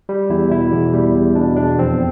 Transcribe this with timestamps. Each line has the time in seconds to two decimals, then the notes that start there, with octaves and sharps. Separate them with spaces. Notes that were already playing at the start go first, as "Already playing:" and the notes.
0.09 G3
0.30 E2 E4
0.51 B2 E4
0.72 E2
0.93 G3
1.15 E2
1.35 B2 D4
1.57 E2 D4
1.79 F2 C4